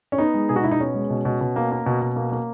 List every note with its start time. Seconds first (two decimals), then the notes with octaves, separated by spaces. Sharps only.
0.12 C#4
0.18 B3 D#4
0.34 G#3
0.49 B2 G#4
0.56 F#4
0.64 B2 E4
0.71 D#4
0.80 B3 C#4
0.94 G#3
1.10 B2
1.25 B2
1.41 B2
1.56 A#3
1.72 A#3
1.86 B2
2.02 B2
2.16 A#3
2.32 A#3